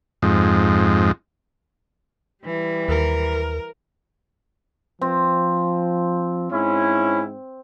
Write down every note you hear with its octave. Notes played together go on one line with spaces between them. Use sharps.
F2 G#2
E3 G3
D#2 A#4
F3 C4
G#2 C#4 E4